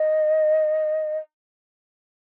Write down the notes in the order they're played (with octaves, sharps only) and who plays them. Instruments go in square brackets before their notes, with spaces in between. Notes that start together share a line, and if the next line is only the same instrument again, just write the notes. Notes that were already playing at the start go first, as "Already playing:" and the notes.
Already playing: [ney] D#5